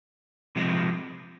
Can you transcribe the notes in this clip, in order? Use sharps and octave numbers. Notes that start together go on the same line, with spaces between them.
C3 F3 G#3